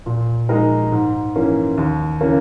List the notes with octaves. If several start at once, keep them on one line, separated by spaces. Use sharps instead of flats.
A#2
G#3 D#4 A#4
G#2
E3 A#3 C#4
D#2
C#3 E3 A#3 C#4